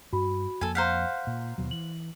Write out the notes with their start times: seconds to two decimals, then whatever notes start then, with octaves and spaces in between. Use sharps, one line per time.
0.13 G2 F#4 B5
0.61 F2 A#3 A4 G#5
0.75 C5 F5 F#5 A#5 G6 B6
1.27 A#2
1.58 D#2 B2 F#3
1.71 E3 F#7